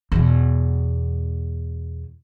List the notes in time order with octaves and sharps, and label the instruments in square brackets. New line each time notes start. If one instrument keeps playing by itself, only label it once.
[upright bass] E2 B2